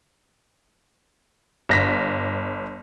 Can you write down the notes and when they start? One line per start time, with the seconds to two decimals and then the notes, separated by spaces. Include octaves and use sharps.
1.69 G1 A#6 B6